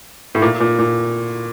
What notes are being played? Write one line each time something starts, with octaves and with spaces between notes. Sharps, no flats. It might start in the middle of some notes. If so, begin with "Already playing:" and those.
A2
A#2
A#2
A#2